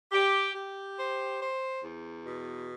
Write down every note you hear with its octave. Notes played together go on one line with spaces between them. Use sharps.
G4
G4
C5
C5
E2
B2